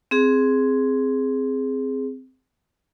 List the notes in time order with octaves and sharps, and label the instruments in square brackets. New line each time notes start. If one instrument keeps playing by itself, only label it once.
[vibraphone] C4 G#4